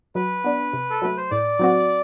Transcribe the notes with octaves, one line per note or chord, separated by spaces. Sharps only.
F#3 B4
B3 D4
C3
A4
F#3 A3 B4
C5
A2 D5
F#3 C4 F#4